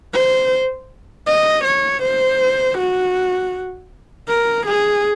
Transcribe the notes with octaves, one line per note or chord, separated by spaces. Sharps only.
C5
D#5
C#5
C5
F#4
A#4
G#4